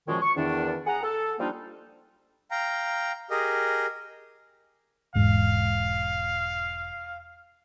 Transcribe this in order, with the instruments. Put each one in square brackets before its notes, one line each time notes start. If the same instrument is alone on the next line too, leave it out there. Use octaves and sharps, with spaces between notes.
[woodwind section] F#2 A#2 D#3 F3 G#3 C#6
C#6
E2 D#3 D4
G#4 F#5 A#5
A4
F3 G3 A#3 D4 D#4 F4
[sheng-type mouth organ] F5 G5 A#5
G4 G#4 A#4 D#5
[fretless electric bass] E1 G#2 [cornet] F5